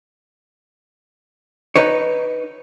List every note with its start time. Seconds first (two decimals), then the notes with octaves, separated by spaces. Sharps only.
1.76 D#4 B4 C#5